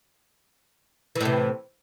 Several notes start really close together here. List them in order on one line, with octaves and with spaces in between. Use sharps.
E3 A2 C3